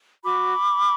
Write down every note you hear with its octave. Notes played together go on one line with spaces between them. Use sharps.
F#4 B5 D6